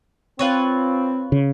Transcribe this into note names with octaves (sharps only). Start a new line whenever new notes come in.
C4 F4 B4 C#5
C#3